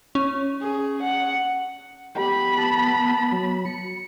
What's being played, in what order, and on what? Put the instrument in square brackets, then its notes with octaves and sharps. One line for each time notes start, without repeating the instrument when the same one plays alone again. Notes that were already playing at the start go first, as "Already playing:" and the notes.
[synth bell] C#4
[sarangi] G#4
F#5
[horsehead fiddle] B3 B5 [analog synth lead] G4
[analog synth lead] A5
F#3
C#7